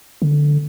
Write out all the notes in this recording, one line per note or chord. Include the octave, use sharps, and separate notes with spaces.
D3